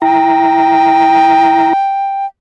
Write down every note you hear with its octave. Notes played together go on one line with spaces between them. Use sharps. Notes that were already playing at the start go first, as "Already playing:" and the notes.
E4 G5 A#5